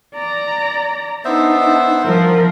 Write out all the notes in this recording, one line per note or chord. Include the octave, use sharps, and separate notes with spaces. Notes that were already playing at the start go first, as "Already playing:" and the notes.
D5 A#5
B3 D4 D#4 C5 E5
F3 A#4